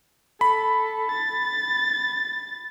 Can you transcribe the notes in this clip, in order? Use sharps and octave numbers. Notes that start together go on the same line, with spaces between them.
A4 B5
A6